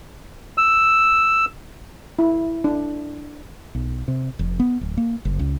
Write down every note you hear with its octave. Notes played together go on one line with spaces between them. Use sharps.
E6
E4
D4
B1
C3
F1
B3
D1
A#3
F#1
C#2